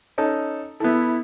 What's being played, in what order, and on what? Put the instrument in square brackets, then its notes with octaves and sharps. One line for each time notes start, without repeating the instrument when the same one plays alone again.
[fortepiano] C#4 D#4 A4
[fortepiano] B3 A4 [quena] E4